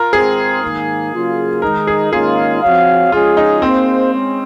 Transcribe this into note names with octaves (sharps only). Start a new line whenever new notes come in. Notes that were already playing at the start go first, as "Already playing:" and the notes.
Already playing: F4 A#4
G#2 D#3 G#3 C4 G#4
G#2 D#3 A#3
C#3 F#3 A#3 F4
D#3 G#3 D#4 A#4
G#4
G#2 D#3 A#3 C#4 F4 G#4
F3 C4 F#4 C#5 F5
F3 G#3 C#4 F4 G#4
D#4
A#3 C4 D#4 G#4 C5 F5
G#3 C#4